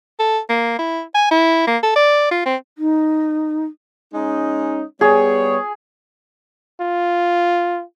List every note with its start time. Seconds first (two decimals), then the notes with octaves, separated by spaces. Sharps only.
0.20 A4
0.50 A#3
0.79 E4
1.15 G#5
1.31 E4
1.67 A#3
1.83 A4
1.96 D5
2.31 F4
2.46 C4
2.78 D#4
4.14 G#3 C#4 D#4
5.01 G3 B3 G#4 C#5
6.81 F4